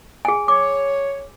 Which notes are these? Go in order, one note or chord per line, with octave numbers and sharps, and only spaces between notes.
G#4 G#5
C#5 D6